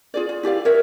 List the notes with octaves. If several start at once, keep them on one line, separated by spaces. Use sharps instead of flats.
F4 G#4 D5
F4
E4 G4 D5 F5
A#4 C#5 E5